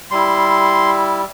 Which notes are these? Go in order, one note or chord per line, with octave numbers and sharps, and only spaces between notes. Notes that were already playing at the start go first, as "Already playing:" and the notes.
G3 E4 C6